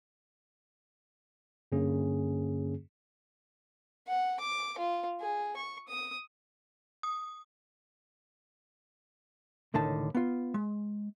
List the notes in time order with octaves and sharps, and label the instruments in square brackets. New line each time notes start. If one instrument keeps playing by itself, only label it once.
[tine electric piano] G2 D3 A#3 C#4 G#4
[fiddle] F#5
D6
F4
G#4
C#6
D#6
[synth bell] D#6
[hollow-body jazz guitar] C#2 A2 D3 D#3 A5
B3 F4
G#3